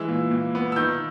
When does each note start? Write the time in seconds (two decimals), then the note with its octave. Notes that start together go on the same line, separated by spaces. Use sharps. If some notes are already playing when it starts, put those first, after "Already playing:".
Already playing: E3 G#3 E6
0.08 A#2
0.31 A#2
0.55 B3
0.72 E6
0.76 D#3 G6